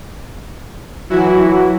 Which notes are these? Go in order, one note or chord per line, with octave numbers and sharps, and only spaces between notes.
E3 F#3 E4 F#4